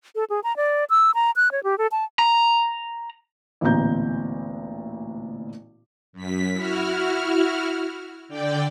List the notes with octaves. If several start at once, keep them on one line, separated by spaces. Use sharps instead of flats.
A4
G#4
A#5
D5
E6
A#5
F#6
C#5
G4
A4
A5
A#5
A1 D2 A#2 B3 A#5 G6
F#2 B6
E4 F#4 F6
D3 D5 G5